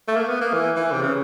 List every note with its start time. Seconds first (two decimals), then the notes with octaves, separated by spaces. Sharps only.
0.08 A3
0.16 A#3
0.28 B3
0.41 A#3
0.53 E3
0.76 E3
0.92 C3
1.02 C#3